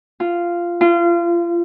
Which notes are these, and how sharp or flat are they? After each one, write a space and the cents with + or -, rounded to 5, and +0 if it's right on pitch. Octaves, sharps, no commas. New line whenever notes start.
F4 -10
F4 -30